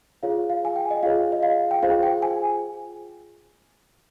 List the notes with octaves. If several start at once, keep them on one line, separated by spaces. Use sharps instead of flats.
F4 G#4 C#5 F5
F5
G#5
G5
D#5
F4 G#4 C#5 F5
D#5
F5
G5
F4 G#4 C5 F5
G5
G#5